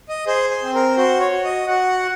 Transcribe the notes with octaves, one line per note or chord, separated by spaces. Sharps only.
D#5
G#4 C5
C5
C4
A#4
F#4 C5
C#5
F#4
D#5
F#4 F#5